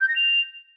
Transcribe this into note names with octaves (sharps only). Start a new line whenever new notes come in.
G6
A#6
F7